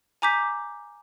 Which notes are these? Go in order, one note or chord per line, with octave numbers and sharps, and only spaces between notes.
G#5 A#5 D6 G6 B6